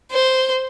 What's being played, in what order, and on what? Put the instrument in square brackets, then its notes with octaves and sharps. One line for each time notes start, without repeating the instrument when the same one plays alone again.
[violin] C5